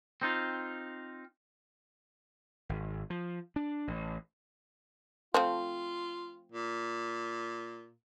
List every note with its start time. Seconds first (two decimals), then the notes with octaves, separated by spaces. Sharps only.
0.22 C4 D#4 F4
2.69 G#1
3.10 F3
3.56 D4
3.87 A1
5.34 F3 A3 C4 F4
6.52 A#2